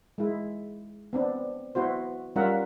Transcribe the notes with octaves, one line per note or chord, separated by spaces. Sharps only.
G#3 E4
B3 C4 D4
B3 E4 F#4 C5
G3 C#4 F4 A#4 E5 F#5